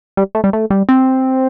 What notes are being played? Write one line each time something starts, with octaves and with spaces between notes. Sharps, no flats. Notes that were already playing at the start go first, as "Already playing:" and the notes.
G3
A3
G3
A3
G3
C4